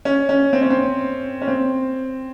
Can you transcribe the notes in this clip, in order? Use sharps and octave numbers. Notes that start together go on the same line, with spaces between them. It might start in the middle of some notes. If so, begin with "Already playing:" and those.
C#4
C#4
C4
C#4
C4
C#4
C4